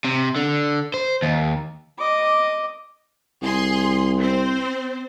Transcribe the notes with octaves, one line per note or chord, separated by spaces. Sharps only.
C3
D3
C5
D#2
D#5 D6
C2 G#4 C6
C4 C5